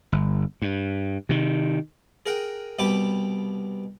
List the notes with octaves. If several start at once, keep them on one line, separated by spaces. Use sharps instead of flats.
G1
G2
C3 D#3
G#4 A#4 F#5 G5
C2 B2 G4 G5 B5 D6